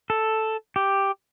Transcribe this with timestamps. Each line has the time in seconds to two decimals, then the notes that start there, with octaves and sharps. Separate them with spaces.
0.10 A4
0.76 G4